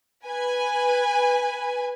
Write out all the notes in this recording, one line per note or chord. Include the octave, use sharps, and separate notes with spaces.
B4 G#5